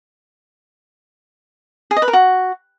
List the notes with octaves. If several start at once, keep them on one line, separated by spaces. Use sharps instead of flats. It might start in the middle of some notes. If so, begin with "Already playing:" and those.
G#4
D#5
B4
A#4
F#4